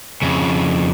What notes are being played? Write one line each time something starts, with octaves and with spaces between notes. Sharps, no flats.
F2 C#3